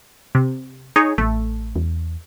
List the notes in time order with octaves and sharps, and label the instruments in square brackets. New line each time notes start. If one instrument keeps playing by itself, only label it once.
[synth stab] C3
D#4 G#4 C#5
[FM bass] A1 [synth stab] A3
[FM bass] E2